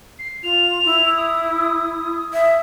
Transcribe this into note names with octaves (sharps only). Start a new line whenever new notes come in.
C7
F4 F7
E4
D#6
E5